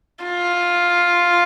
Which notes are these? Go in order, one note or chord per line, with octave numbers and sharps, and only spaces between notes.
F4